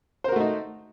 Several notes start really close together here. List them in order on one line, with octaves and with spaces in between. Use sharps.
C5 A#4 F#4 A3 D#4